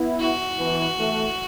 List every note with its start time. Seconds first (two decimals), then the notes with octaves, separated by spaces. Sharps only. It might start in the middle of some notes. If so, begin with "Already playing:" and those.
Already playing: B3 E4
0.20 F#4
0.59 B2 E3
0.98 E3 A3